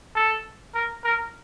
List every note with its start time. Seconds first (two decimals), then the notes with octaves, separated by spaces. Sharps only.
0.15 A4
0.74 A#4
1.04 A#4